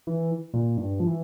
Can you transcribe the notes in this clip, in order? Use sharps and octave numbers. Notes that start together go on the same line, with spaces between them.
E3
A#2
G2
F3
E3